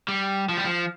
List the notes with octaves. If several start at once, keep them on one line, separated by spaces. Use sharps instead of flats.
G3
F3
G3
F3